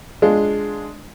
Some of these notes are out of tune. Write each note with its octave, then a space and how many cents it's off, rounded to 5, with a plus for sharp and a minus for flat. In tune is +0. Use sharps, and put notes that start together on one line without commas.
G#3 +5 D4 +0 F4 +0